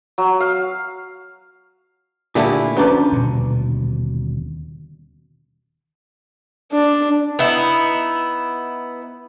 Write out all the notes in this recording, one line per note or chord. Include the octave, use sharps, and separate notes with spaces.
F#3
F5
A#2 D3 A3 E4 G4 G#4
F#2 F3 C#4 D4 B4 D5
D#1 B2 D3
D4
B3 D#4 E4